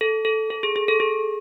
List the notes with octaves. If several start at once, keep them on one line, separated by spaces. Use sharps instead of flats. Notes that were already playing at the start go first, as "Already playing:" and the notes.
A4
A4
A4
G#4
G#4
A4
G#4